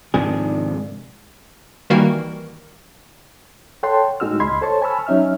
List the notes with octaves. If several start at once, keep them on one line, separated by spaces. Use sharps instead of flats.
G#2 C3 D#3 F3 D4 G#4
D#3 E3 G3 A#3 F#4 A#4
A4 C#5 F#5 G5 A5 C6
A2 G#3 D#4 F#4 E6 F6
C#2 D#5 B5 C6 G#6
A4 C5 C#5 A5 C#6
G#5 A5 B5 C#6 E6 F6
F#3 C#4 D#4 E5 F6